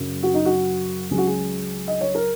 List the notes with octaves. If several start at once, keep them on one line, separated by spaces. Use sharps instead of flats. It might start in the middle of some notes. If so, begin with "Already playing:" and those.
Already playing: F#2 C#3 F#3
F#4
D#4
F#4
C#2 C#3 F#3 G#4
F#4
G#4
D#5
C#5
A#4